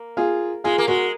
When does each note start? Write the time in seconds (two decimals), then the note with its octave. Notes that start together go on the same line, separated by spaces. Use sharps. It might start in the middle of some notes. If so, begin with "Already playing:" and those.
Already playing: A#3
0.17 F4 G#4
0.64 G#3 F4 G#4
0.78 A#3
0.87 G#3 F#4 A#4